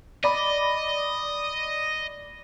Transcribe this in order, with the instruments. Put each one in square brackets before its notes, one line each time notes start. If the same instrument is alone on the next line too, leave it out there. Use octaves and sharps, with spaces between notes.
[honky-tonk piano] D5 B5 [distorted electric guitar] D#5